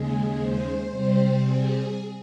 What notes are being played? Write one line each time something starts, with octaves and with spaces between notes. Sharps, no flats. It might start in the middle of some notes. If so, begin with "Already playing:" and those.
Already playing: D#2 C#3 G#3 G#4
C5
C3 G3 C4 C5
G#4